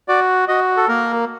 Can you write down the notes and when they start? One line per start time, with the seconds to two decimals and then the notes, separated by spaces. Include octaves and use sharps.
0.08 F#4 D5
0.48 F#4 D#5
0.77 A4
0.88 A#3 A#4